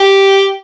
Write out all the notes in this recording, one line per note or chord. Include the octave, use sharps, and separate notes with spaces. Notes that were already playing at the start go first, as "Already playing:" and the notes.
Already playing: G4